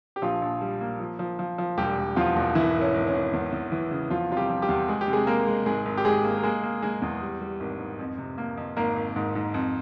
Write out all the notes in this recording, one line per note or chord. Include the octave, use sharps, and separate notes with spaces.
G4
A#1 F3 F4
A#1
G3
A#3
F3
F3
F3
F3
E1 G3 G4
E1
E2 F3 F4
E1
G#1 E3 E4
G#1
C#4
G#1
C#4
G#1
E2
E2
E3
C#3
E2 F3 F4
C3 F4
G3 G4
F3
G3 G4
E2
G#3 G#4
G4
C3
G#3 G#4
G#3 A#3 A#4
G#3
G#1 G#3 G#4
G#1
G4
G#1 G#3 G#4
A#3
A#4
G#3 A#3 G#4
A#3
G#3 A#3 G#4
E2
G3
G3
G#1
G#2
F2
C3
A#3
F2
G#1 A#3 A#4
G#1
G#2
G#2
F2